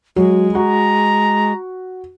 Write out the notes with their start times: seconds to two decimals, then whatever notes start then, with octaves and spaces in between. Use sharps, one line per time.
0.16 F#3 G#3
0.55 F#4 A#5